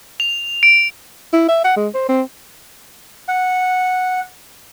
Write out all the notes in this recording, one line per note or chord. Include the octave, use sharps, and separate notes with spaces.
F7
D7
E4
E5
F#5
G#3
C5
C4
F#5